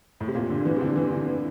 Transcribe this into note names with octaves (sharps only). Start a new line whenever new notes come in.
A2
C3
A#2
D3
E3
C3
D3
E3
D3
E3